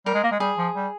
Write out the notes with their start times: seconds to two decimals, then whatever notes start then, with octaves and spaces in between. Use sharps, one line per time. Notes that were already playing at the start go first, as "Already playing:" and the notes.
0.06 G3 A#4
0.14 G#3
0.23 A#3
0.32 G#3
0.40 G3 G#4
0.58 F3
0.76 G3